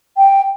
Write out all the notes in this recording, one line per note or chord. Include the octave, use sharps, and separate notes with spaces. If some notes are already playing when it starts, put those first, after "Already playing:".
G5